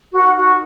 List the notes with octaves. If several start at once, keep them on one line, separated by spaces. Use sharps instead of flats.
D#4 F#4 A#4 F#5
F#4 F#5